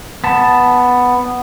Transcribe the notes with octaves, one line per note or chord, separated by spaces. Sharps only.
B3 A5